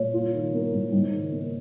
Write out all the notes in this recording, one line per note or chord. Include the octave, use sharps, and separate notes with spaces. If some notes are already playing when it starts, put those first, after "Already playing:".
Already playing: A#2 C#5
F4
D#3
A#3
G#2
G#2
D#3
A#3